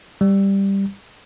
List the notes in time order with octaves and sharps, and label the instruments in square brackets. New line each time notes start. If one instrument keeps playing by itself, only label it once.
[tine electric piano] G3